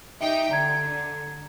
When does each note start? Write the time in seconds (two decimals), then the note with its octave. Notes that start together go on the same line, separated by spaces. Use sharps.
0.21 D#4 G4 E5 G5
0.51 D3 A#5 G#6